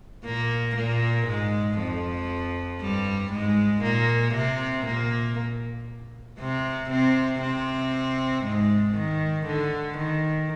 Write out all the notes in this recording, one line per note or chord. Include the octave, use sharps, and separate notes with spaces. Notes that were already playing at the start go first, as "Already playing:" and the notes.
A#2 A#3
A#2 A#3
G#2 G#3
F2 F3
G2 G3
G#2 G#3
A#2 A#3
C3 C4
A#2 A#3
C3 C4
C3 C4
C3 C4
G#2 G#3
D#3
D3
D#3